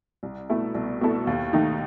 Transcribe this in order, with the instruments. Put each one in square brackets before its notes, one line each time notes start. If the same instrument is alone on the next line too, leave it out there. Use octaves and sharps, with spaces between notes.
[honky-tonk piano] C2
B2 A3 E4 A4
C2
B2 A3 E4 A4
D#2
D#3 A3 D#4